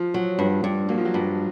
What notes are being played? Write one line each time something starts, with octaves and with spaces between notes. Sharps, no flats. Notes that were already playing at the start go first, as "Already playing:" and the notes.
Already playing: F3
F#3
G2
G2
F#3 A#3
F3
F#3
G2